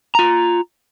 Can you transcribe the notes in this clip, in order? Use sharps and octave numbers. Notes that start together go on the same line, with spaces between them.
F4 A#5